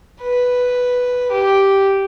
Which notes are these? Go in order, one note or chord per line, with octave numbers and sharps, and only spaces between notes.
B4
G4